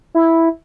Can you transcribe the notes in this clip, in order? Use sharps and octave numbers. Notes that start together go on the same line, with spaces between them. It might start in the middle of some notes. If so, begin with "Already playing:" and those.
E4